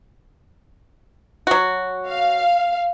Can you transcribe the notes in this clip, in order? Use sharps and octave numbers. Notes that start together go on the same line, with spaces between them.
F#3 F#4
F5